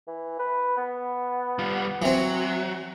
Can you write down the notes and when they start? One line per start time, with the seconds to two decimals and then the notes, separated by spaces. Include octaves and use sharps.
0.08 E3
0.39 B4
0.77 B3
1.59 G3 F4
2.02 E3 F#3 C4